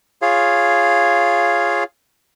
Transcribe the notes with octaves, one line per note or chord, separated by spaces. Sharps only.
F4 G#4 C#5 F5